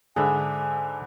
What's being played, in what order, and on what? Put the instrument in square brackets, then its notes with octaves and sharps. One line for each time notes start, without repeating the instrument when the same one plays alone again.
[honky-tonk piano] G#2 D3 [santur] D4 E5 B5 [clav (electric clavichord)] G#4 [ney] G#5